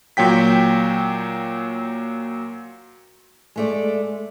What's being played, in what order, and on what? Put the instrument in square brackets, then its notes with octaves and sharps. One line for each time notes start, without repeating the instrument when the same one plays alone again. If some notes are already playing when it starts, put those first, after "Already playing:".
[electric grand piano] A#2 F#3 G5 B6
[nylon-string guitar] G#3 A3 D5